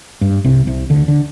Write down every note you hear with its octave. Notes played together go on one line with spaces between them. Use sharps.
G2
C2 C3
C2 C3
D2 D3
D3